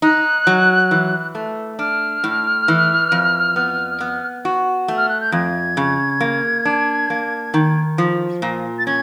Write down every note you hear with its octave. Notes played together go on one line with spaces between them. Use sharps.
D#4 F#6
F#3
E3
A3
D4 F6
A2
E3
F2
B3
B3
F#4
A3
F6
F#6
G6
F2 G#6
C#3
A#3
D4
A#3
D#3
F3
A#2
A6
C#4 G#6